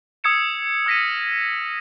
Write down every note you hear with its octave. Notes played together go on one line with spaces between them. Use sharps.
D#6 E6 G#6 C#7 E7
E6 F6 A#6 B6 C#7 D#7